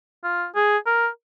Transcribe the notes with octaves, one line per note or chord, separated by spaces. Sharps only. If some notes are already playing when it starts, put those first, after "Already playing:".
F4
G#4
A#4